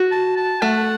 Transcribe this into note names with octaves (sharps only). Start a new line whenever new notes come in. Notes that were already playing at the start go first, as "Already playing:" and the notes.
Already playing: F#4
A5
A5
A3 F#5